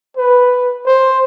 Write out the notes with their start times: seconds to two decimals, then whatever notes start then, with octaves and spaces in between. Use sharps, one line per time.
0.17 B4
0.86 C5